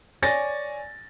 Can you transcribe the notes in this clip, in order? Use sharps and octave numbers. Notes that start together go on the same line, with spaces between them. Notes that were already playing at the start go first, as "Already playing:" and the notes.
C#5 D5 G#5 A6 A#6